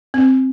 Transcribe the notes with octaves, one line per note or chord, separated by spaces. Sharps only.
C4